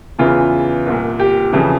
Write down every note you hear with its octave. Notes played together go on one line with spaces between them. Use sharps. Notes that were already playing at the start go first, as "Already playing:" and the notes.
E2 C#3 E3 F4
C2 A#2
G4
F2 C#3 E3